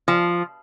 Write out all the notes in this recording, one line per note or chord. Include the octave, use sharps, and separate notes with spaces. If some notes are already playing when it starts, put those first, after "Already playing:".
F3